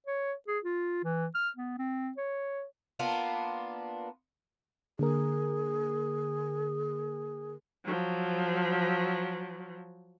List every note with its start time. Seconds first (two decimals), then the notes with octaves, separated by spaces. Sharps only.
0.07 C#5
0.48 G#4
0.64 F4
1.04 E3
1.35 F6
1.57 B3
1.78 C4
2.17 C#5
2.99 A#3 B3 D4 F4
4.99 D3 A#3 G#4 A#4
7.85 F3 F#3